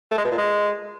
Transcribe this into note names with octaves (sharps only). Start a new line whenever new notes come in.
A3
G#3
B2
A#2
G#3